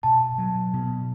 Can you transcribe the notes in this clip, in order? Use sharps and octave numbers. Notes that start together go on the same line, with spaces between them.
B2 A5
F#3
B2